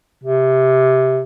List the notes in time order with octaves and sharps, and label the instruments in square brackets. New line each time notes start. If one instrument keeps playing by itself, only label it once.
[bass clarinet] C3